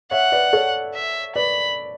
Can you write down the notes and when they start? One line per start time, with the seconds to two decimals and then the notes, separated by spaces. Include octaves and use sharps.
0.11 C#5 E5 F#5
0.32 B4 D5
0.53 A4 C#5
0.95 E5
1.36 B4 D5 B5